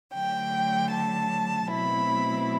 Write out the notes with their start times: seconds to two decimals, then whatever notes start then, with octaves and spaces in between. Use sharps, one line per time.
0.14 D3 F#3 A3 G5
0.92 A5
1.69 B2 F#3 A3 C4 E4 B5